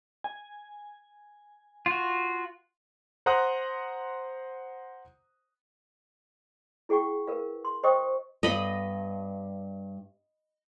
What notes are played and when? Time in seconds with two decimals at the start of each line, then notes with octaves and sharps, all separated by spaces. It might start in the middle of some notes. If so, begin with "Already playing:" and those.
0.24 G#5
1.86 F4 F#4
3.26 C5 F#5 A#5 C6 D#6 F#6
6.89 E4 G#4 F#5 G5 C#6
7.27 A#4 B4 F5
7.65 C6
7.83 C5 D#5 G5 C#6 D#6
8.43 G2 B3 D#5 B5